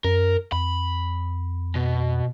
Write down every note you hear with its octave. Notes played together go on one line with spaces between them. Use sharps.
F#2 A#4
F2 B5
B2